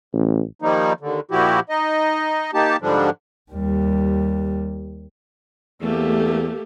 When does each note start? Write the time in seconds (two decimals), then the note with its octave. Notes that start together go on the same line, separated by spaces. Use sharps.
0.13 A1
0.62 D#3 F3 G3 A#3 D#4
1.00 D#2 D3
1.31 A#2 F3 E4 F#4 G4
1.69 D#4 D#5
2.54 A#3 D#4 G4 A5
2.81 G#2 D3 F3 G3 D4
3.52 D#2 G3
5.82 E2 A3 A#3 G4